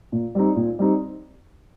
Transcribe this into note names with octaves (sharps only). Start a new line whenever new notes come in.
A#2
G3 C4 D#4
A#2
G3 C4 D#4